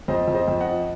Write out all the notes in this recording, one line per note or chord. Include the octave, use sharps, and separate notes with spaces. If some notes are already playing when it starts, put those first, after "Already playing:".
F2 C5 D#5
F2
C5 D#5
F2
D#5 F#5
F3